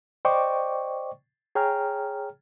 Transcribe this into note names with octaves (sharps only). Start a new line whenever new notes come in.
C5 D5 D#5 G5 C#6 D6
G#4 C#5 G5 A#5 F6